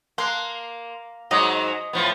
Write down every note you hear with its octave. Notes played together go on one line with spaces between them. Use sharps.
A#3 C6 F#6
G#2 F#3 D#5
A2 F3 B3